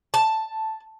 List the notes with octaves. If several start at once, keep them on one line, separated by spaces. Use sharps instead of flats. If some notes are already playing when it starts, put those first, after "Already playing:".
A5